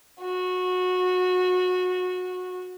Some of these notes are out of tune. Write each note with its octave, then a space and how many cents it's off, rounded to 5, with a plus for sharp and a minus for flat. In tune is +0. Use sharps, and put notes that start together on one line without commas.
F#4 -20